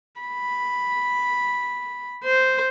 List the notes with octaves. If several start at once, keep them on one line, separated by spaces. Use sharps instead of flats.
B5
C5